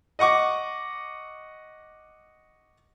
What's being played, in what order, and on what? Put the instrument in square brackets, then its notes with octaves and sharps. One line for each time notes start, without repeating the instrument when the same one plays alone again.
[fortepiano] D#5 F#5 C#6 D6